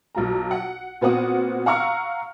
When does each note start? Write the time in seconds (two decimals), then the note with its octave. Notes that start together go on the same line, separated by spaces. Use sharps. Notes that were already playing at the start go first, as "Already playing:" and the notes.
0.15 B1 F4 A#5
0.51 F#5
1.01 A#2 B3 C4 F#4 F#5 D#6
1.66 F5 F#5 A#5 C#6 E6 F6